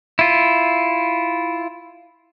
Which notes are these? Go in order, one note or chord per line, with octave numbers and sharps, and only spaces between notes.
E4 F4